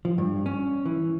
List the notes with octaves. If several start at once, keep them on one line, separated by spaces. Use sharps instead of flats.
F3
G2
C#4
E3